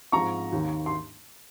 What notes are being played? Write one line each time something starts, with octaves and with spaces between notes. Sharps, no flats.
G#2 F3 C4 A#5 C#6
D#2 D#3 A#3
C6